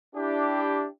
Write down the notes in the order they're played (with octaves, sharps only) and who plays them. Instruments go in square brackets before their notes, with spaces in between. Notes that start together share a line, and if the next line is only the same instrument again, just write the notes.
[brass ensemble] D4 E4 G4